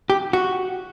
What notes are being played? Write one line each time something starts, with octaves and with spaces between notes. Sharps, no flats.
G4
F#4